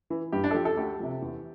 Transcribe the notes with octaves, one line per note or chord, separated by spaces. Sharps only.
E3
G2 G4
D4
A4
F3 G4
A4
D2 G4
C3 F3
E2